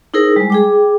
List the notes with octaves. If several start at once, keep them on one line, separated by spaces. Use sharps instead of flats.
D#4 E4 G#4 A#4 C5
G3 G#3
G#4 G5 D6